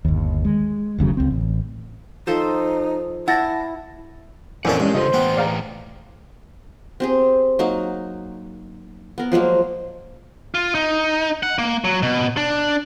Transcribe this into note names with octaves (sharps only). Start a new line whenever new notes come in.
G1 D#2
G#3
F1 D2 C#3 F#3
C#2 C4
A1
F3 D#4 A4 C5
E4 F#5 A5 A6 A#6
F2 A#2 E3 C#4 A4 D5 F#5
G2 G#3 C#4
C#3 F4 A4 C5 D#5
A2 E3 B3 G5
D5 F5 A#5
C4 G4 G#4
F#3 A#3 D#4
B3 A#4
F3 F#3 G#3 A#3
F4
D#4
F#5
A#3
F#3
B2
D4